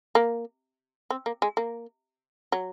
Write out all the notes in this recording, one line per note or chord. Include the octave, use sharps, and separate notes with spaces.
A#3
C4
A#3
G#3
A#3
F#3